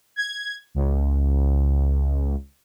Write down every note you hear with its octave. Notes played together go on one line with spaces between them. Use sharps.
G#6
C#2